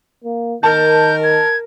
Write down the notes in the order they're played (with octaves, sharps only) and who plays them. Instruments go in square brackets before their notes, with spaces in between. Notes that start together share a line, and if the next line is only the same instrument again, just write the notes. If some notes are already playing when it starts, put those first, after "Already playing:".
[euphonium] A#3
[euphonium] D#3 [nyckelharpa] A#4 [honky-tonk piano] A5 [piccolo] G6
[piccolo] G#6